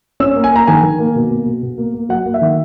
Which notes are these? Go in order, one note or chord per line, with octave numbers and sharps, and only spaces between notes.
C#4 E6
A#3
G#5
A#3 A#5
D#3 G#5
D#3
A#3
B2
A#3
B2
B2
A#3
A#3
F#3 F#5
A#3
E5
D#3